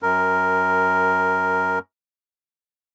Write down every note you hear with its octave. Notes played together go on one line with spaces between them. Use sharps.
F#2 A#4